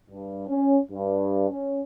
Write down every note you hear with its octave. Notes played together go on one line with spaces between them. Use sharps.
G2
C#4
G2
C#4